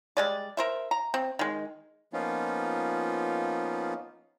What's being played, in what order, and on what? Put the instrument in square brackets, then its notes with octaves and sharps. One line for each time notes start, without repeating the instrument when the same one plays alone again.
[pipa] G3 G#3 D5
A#4 C5 E5
A#5
C4
D#3 G#3
[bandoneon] F3 A#3 B3 C#4 D#4 F4